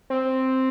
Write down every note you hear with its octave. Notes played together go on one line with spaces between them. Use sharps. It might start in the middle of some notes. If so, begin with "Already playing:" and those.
C4